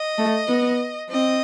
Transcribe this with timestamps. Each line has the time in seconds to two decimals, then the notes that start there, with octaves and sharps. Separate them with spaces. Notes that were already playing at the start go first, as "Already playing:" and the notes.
Already playing: D#5
0.18 A3
0.49 B3
1.11 C4 D#5